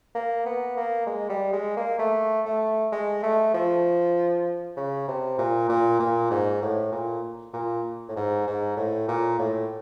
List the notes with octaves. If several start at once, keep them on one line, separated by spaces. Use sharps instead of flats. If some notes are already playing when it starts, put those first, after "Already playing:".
A#3
B3
A#3
G#3
G3
G#3
A#3
A3
A3
G#3
A3
F3
C#3
C3
A#2
A#2
A#2
G#2
A2
A#2
A#2
A2
G#2
G#2
A2
A#2
A2